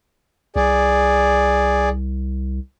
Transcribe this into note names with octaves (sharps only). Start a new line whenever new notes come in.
C2 G#4 D5